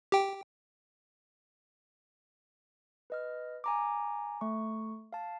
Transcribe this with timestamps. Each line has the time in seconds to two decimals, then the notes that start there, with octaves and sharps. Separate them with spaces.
0.12 G4 G5
3.10 B4 D#5 F6
3.64 G#5 A#5 D6
4.41 A3 C#6
5.13 F5 A5